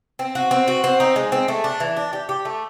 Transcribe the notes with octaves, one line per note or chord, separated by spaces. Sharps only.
C4
F#4
C4
F#4
C4
D#4
G#3
C4
A3
D4
E3
D4
G4
G4
A3